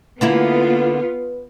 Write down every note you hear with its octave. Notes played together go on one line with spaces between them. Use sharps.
D3 A#3 B3 E4 F4 B4